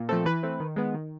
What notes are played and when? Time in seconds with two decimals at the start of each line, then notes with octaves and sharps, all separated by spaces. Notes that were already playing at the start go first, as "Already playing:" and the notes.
Already playing: A#2
0.09 F3 A3 C4 A4
0.25 E3 B4
0.43 A3 C4
0.60 D#3
0.76 G#3 B3
0.94 D#3